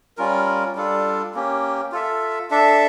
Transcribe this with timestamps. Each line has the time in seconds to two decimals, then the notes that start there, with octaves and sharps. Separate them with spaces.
0.17 G3 C#4 F4 A#4
0.76 G3 D4 F4 A4
1.34 A#3 C#4 G4
1.92 F4 A4 E5
2.51 D4 A4 E5